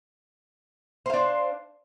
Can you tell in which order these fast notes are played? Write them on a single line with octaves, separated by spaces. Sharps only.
C5 F5 D4